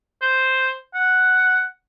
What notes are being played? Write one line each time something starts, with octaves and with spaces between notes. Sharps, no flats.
C5
F#5